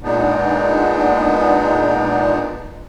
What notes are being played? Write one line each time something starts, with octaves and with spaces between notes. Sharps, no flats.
A#2 G#3 B3 D4 D#4